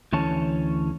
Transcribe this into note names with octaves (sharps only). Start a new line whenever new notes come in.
D2 E3 C#4 A4 C#5 A5